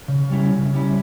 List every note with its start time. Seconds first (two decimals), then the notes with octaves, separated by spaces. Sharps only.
0.08 C#3
0.30 G3 C#4 E4
0.52 C#3
0.74 G3 C#4 E4